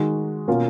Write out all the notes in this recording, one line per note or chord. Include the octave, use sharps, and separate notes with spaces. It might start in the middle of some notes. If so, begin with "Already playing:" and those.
Already playing: D#3 G#3 D#4 F#4
B2 A#3 C#4 F4